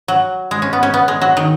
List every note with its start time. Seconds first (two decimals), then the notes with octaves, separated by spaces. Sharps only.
0.08 F#3
0.51 G#3
0.62 C#4
0.73 B3
0.83 C#4
0.94 B3
1.08 G#3
1.22 F#3
1.37 D#3